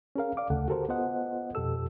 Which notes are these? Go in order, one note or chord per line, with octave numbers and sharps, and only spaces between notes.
C#4 G#4 A#4 F5
D5 F5 D6
D2 C#3 A3 A4 F#5
F#4 G4 A4 A#4 C5
B3 F4 A4 C5 D#5 F#5
F2 B2 G4 A4 E6